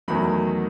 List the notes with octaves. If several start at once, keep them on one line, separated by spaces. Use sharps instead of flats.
E2 D#3 F#3 A3 B5